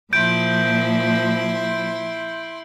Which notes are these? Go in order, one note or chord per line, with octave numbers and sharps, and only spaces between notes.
A#2 F3 E4 C6 G6 D7